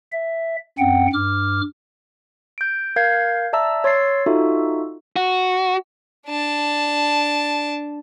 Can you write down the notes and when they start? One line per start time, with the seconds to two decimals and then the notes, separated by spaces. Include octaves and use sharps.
0.12 E5
0.79 F#2 C4 F#5 G5
1.13 G2 D6 F6
2.58 G6 D7
2.96 A#4 F5 G6 G#6 C7
3.53 D5 E5 A5 A#5 E6
3.84 C#5 C6 E6 A6 C7
4.26 D#4 F4 F#4 A4 E5
5.16 F#4
6.27 D4 A5